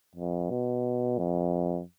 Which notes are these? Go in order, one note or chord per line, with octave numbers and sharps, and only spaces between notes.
F2
B2
F2